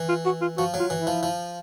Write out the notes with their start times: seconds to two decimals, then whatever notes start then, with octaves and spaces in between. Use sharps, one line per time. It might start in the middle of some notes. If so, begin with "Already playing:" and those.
Already playing: E3
0.09 F4
0.26 F#4
0.41 F4
0.58 F3 F#4
0.74 F#3
0.79 F4
0.90 E3
1.01 E4
1.07 F3
1.23 F3